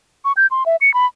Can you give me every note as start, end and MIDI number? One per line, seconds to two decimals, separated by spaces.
0.25 0.32 85
0.37 0.47 91
0.51 0.63 84
0.66 0.76 76
0.81 0.93 97
0.94 1.06 83